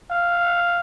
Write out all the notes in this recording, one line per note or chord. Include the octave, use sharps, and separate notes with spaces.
F5